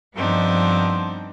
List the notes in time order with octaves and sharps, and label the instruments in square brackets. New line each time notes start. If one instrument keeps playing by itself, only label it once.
[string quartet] G2 F3 B3 C4 D4 D#4